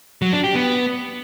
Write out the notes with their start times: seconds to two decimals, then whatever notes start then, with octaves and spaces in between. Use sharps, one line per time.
0.22 F#3
0.33 D4
0.44 G4
0.55 B3